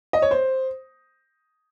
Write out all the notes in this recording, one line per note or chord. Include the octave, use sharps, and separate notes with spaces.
D#5
C#5
C5